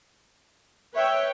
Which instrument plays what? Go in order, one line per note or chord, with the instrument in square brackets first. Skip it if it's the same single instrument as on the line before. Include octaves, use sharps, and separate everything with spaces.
[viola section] B4 C#5 G5 [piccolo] E5